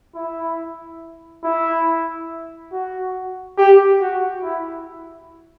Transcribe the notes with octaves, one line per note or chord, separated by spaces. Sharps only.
E4
E4
F#4
G4
F#4
E4